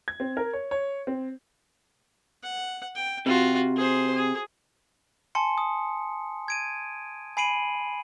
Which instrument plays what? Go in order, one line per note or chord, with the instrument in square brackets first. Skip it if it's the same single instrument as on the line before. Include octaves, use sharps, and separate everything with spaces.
[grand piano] G#6
C4
A#4
C#5
C#5
C4
[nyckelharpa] F#5
G5
[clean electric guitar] C3 [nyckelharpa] F4 F#4
[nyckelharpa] G#4 C5
G#4
[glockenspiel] G#5 A5 C6 C#7
D#6
G#6 D7 D#7
G#5 B5 C7 D7 D#7 F#7